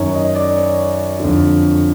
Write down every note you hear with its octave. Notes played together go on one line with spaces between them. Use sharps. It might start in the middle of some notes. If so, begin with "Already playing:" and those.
Already playing: F#2 D#3 C#5
D#5
D5
C#5
F2 D3